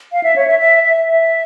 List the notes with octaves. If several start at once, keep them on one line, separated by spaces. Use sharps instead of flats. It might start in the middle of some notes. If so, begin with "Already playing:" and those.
F5
E5
C#5
E5
E5
E5
E5